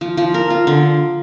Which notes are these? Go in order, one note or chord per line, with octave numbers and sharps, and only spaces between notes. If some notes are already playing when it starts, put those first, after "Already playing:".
F3
F3
A#4
F4
D3